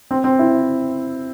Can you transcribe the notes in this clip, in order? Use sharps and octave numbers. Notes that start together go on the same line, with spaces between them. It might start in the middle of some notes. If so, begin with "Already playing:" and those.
C4
C4
E4